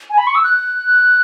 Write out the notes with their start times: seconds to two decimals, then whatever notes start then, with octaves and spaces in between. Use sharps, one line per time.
0.10 G#5
0.18 B5
0.27 C#6
0.35 E6
0.44 F#6